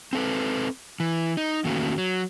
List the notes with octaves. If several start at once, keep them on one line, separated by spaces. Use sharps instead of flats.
C4 A4 B4
E3
D#4
E2 D#3 A3 A#3 C#4 F#4
F#3